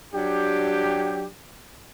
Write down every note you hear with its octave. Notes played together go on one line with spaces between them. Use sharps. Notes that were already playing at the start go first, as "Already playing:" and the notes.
F#3 D4 G4